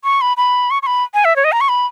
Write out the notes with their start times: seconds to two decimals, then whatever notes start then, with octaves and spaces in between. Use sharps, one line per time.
0.04 C#6
0.21 B5
0.37 B5
0.70 C#6
0.83 C#6
0.87 B5
1.14 G#5
1.25 E5
1.36 C#5
1.44 D#5
1.52 A#5
1.61 C#6
1.69 B5